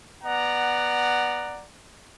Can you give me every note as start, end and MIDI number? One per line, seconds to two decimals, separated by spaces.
0.24 1.65 59
0.24 1.65 74
0.24 1.65 78
0.24 1.65 82